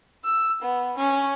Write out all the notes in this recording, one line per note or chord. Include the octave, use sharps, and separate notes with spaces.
E6
B3
C#4